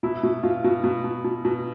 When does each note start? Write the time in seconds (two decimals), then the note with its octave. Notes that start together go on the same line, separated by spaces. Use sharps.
0.03 B2 E4
0.23 B2
0.43 B2 F4
0.64 B2
0.84 B2
1.04 B2
1.24 B2
1.45 B2